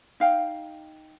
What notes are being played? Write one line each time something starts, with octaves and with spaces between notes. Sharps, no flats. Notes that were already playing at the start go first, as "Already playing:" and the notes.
D#4 F5 G5